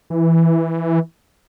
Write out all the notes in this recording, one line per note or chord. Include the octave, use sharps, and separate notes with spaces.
E3